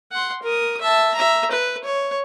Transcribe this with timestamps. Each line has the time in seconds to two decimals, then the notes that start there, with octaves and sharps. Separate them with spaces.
0.12 F#5 C6
0.43 A#4 D#6
0.82 E5 A5
1.14 E5 A#5
1.51 B4
1.84 C#5